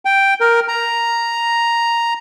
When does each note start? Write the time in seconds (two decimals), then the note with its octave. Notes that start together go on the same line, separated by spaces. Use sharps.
0.05 G5
0.41 A#4
0.68 A#5